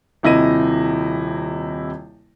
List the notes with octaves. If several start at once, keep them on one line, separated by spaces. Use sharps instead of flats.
D#1 C3 E4 D#5 A#6 D#7